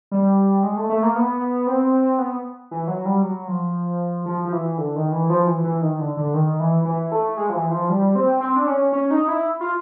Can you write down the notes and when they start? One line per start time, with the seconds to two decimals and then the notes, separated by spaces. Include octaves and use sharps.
0.11 G3
0.63 G#3
0.77 A3
0.89 A3
1.03 A#3
1.16 B3
1.67 C4
2.18 B3
2.71 E3
2.88 F#3
3.05 G3
3.22 F#3
3.48 F3
4.26 F3
4.45 F3
4.52 E3
4.78 D3
4.96 D#3
5.12 E3
5.30 F3
5.47 E3
5.64 E3
5.82 D#3
6.00 D3
6.17 D3
6.34 D#3
6.60 E3
6.85 E3
7.12 A3
7.37 G#3
7.50 F3
7.54 E3
7.71 F3
7.89 G3
8.15 C4
8.40 C4
8.56 D4
8.67 C#4
8.93 C#4
9.11 D#4
9.28 E4
9.61 F4